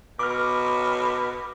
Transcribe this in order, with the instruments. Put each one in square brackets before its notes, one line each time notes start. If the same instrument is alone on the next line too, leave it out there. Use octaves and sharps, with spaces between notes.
[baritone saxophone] B2 [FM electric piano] D6 F6